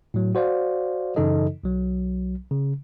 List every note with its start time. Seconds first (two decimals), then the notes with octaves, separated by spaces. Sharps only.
0.14 A2 F#3
0.35 F#4 C5 D5 F5
1.16 F#2 C#3 E3 D#4 A4 D#5
1.64 B1 F#3
2.51 C#3